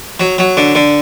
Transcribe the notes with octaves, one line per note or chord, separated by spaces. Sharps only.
F#3
F#3
D3
D3